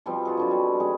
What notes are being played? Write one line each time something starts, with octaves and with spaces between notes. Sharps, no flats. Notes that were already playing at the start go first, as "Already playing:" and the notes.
B2 F3 G3 C4
F4 F#4 G#4
D3 F#3 D4
G3 G#5
G#3 C#4 F#4 G#4